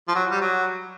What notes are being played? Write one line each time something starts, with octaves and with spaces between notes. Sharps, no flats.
F3
F#3
G3
F#3